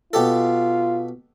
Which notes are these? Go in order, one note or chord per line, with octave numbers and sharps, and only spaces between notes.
B2 F4 G4 A4